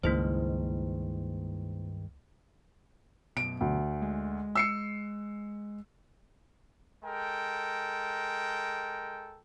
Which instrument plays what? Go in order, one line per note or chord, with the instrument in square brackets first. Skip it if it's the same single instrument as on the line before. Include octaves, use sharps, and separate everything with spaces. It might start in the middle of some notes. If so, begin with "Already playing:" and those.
[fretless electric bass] C#2 [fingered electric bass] G2 D#3 G#3 [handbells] A#3 E4 C5
[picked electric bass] F#2 B2 [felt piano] D7
[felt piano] D2
[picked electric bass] G#3
[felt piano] E6 C7 C#7
[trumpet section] G#3 A4 A#4 G5